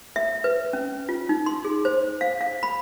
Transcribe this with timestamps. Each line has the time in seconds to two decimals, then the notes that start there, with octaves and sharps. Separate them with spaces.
0.16 E5
0.44 B4
0.73 C#4
1.09 F4
1.29 D#4
1.46 C6
1.65 G#4
1.85 C5
2.21 F5
2.41 F5
2.63 B5